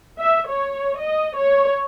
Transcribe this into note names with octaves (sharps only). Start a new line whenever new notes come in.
E5
C#5
D#5
C#5